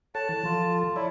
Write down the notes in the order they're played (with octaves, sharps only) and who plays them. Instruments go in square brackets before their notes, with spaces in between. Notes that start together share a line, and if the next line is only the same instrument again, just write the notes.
[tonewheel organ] A4 C#5 F#5 [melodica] A5
[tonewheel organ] E3
[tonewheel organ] F3 A4 [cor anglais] F4
[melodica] E4 [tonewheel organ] C#5 D5 E5